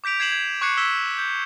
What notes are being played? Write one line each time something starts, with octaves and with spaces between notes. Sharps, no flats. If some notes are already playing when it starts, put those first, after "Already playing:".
D6 G6 B6 D7 F7
G#6 C7 E7 F#7
G#6
C#6 D6 F#6 G#6 C7 C#7
E6 G#6 B6 E7 G7
G6